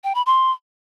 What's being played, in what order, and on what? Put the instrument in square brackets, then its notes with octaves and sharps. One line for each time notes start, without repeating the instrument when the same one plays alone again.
[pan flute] G5
B5
C6